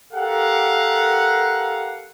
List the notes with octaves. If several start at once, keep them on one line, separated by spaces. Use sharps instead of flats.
G4 A4 A#4 F5 F#5